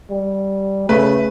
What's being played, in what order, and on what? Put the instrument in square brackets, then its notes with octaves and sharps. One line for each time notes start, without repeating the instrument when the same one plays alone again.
[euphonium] G3
[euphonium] C#3 [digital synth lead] A3 [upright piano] B4